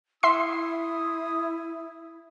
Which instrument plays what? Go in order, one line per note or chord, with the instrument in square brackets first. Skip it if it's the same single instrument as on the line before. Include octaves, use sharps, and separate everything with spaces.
[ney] E4 [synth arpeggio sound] E5 C6 C7 [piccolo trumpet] D#6